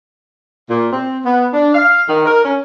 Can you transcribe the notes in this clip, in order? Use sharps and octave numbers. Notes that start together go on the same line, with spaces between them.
A#2
C4
B3
D4
F5
D#3
A#4
C#4